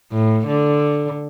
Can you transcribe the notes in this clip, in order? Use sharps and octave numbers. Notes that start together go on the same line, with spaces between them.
A2
D3